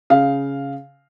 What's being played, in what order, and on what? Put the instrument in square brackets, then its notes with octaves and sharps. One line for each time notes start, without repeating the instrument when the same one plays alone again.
[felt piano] C#3 F5